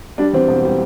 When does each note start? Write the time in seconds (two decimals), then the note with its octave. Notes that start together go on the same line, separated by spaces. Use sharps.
0.18 G3 D4
0.33 E2 C4
0.48 E1
0.64 G3